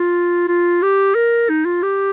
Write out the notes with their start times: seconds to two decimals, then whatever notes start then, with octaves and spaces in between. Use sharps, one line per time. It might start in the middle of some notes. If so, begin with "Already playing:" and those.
Already playing: F4
0.48 F4
0.82 G4
1.15 A#4
1.49 D#4
1.65 F4
1.83 G4